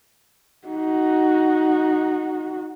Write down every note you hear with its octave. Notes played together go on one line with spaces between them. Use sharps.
D#4 F#4